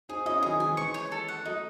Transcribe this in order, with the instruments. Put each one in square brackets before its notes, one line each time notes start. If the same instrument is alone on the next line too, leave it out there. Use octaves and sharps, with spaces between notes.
[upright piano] C4 D#4 [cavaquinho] G#4
[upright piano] C#4 E4 [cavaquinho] D#5
[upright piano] D#3 F#3 [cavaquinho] G#4
[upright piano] D#3 F#3
[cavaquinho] G#5
[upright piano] E3 G#3
[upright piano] E3 G#3 [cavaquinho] C#6
[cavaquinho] C#5
A4
F#5
[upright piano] F#3 A3 [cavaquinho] D#4